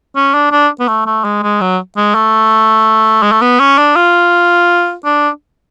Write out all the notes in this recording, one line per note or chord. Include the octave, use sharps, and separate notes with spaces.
C#4
D4
D4
B3
A3
A3
G#3
G#3
F#3
G#3
A3
G#3
A3
B3
C#4
D4
F4
D4